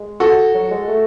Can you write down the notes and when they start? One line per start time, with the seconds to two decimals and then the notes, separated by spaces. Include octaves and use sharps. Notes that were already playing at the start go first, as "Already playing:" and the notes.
Already playing: G#3
0.20 F#4 A4
0.55 F#3
0.71 G#3
0.88 A3